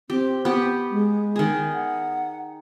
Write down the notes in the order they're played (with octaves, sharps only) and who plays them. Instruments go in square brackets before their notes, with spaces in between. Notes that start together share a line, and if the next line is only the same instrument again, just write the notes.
[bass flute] C4 [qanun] G4
[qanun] B3 G4
[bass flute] G#3
[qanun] D#3 G#4
[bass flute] F#5